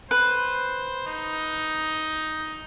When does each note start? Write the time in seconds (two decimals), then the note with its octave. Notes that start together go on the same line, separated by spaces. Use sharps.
0.11 B4 C5
1.07 D#4